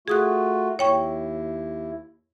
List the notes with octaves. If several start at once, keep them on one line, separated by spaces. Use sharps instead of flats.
A3 F4 F#4 G#4 D#6 F#6
D#2 E4 C#5 G5 C#6